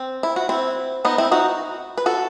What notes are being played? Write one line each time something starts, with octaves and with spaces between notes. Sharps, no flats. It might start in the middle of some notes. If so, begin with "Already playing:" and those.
Already playing: C4
E4
F#4
C4 E4
B3 D#4
C4 E4
D#4 F#4
B4
F#4 A4